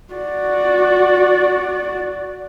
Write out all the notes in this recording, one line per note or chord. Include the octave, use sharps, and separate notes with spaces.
F#4 D5